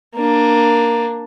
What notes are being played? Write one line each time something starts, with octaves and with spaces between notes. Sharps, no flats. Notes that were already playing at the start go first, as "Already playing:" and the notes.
A#3 D4